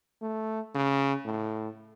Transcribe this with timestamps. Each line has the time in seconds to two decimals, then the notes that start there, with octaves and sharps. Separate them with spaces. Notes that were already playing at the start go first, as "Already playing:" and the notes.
0.22 A3
0.75 C#3
1.25 A2